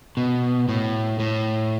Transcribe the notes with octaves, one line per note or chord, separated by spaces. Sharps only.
B2
A2
A2